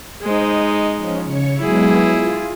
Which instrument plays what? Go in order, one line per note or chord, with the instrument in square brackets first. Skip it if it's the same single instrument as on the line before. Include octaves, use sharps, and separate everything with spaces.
[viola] G#3 D#4 [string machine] C5
[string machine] F3 C#4
C#3 C#5 C#6
[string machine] F#3 G#3 B3 [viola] E4 G#4
[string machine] F4